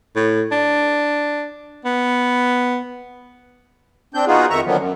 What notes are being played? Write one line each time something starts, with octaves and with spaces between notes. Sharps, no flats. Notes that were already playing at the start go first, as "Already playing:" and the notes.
A2
D4
B3
C4 D4 G6
B3 D#4 F4 F#4 G#4
F2 D#3 E5 A#5 C#6
D3 D#3 F3 F#3 A#3 B3
F#2